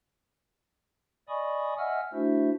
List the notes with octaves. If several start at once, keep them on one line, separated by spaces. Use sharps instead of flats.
D5 D#5 G#5 B5 C#6 D#6
D#5 E5 F#5 G#5 E6 F6
A3 D4 E4 F#4 C5 E5